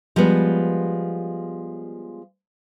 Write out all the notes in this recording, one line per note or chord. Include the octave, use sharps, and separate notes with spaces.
F3 G3 G#3 B3